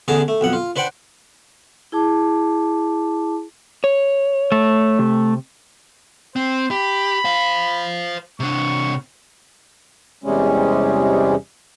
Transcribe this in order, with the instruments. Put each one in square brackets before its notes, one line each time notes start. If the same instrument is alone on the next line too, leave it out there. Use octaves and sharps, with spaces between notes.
[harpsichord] A1 E2 D3 G#4 A5 A#5
A3
B1 F2 F#5
F4
D4 B4 C5 F#5 G5
[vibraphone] E4 G#4 A5 D6
[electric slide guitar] C#5
[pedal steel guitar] A3
[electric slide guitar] C3
[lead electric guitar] C4 [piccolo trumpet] C5
[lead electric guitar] G4 [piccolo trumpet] B5
[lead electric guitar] C5 F5
[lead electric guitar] C3 D4 [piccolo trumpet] C#6
[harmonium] E2 C3 G3 G#3 C#4